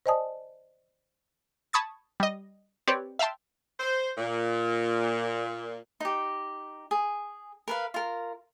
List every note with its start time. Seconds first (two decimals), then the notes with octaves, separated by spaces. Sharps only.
0.06 C5 D5 D#5 G#5 A5 D#6
1.73 A5 B5 C#6 D#6 G#6 A6
2.20 G3 D#5
2.88 C4 G4 B4 C#5 D5
3.19 E5 F5 G5 A5 C6
3.80 C5
4.18 A#2
6.00 D#4 G4
6.91 G#4
7.68 A#4 B4 F5
7.94 F4 A#4